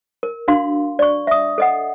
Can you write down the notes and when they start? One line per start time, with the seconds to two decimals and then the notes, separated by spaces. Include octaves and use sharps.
0.23 A#4
0.48 D4 F#4 F5 C6
0.99 D5 C#6
1.27 E5 D#6
1.58 A4 D#5 F#5